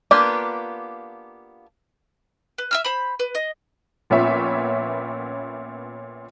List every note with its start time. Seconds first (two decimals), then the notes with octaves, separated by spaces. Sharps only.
0.11 A#3 B3 D4 F4 G4
2.58 B4
2.71 E5 E6 F6
2.84 C5 B5
3.20 B4
3.35 D#5
4.10 A#1 A#2 B3 C#4 E5